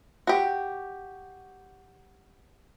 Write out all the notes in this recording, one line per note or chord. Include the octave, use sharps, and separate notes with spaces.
F#4 G4